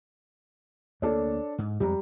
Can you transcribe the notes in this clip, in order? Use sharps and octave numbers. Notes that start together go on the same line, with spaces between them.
D2 A#3 D4 A4 C#5
G#2
F2 G3 G#3 A#5